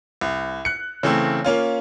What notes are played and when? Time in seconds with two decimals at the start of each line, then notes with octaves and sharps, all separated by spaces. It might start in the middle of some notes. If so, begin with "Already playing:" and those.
0.21 C2
0.65 F#6 C#7
1.03 C#3 E3 A3 C4
1.44 A#3 C#4 F4